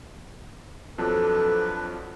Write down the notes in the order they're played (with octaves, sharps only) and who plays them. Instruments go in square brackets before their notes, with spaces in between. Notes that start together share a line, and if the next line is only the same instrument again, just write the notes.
[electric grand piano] F2 F3 F#3 [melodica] D4 B4 [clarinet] A4